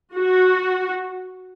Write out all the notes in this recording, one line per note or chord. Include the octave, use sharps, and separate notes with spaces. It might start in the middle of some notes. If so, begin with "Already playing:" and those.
F#4